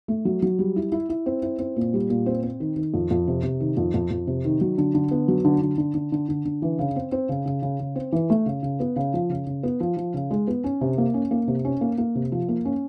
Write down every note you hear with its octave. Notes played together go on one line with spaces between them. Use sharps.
A3
F#3
F#3
G3
E4
E4
E4
C4
E4
C4
A#2
G3
A#2
C4
C4
D#3
D#3
F2
F2
C3
C3
D#3
F2
F2
F2
C3
D#3
F#3
D3
D3
B3
F#3
D3
D3
D3
D3
D3
D3
D3
E3
C#3
C4
C4
C#3
C#3
C#3
C#3
C4
E3
A3
C#3
C#3
B3
C#3
F3
C#3
C#3
B3
F3
F3
C#3
G#3
B3
C#4
C3
A#3
C#4
A#3
C3
C#4
A#3
A#3
C3
F3
A#3
C#4